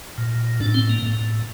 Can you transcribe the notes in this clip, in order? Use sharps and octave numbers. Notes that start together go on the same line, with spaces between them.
A#2
A2 D4
C4
A#3
A2